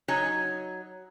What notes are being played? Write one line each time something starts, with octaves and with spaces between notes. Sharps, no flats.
F#3 D#4 F#4 C#5 G#5